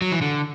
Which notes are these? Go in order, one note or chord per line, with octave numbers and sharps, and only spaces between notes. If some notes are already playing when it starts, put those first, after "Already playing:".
F#3
E3
D3